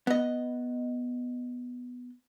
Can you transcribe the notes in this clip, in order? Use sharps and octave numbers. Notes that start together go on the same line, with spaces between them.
B3 D#5